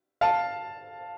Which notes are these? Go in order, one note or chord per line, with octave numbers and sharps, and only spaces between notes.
F5 A5